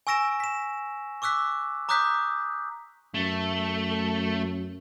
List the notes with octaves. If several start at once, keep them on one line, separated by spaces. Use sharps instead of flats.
G#5 C#6 E6 A#6 D7 E7
B6 E7
C#6 D6 E6 F#6 B6
A#5 D6 D#6 F#6 G6 B6
F#2 A3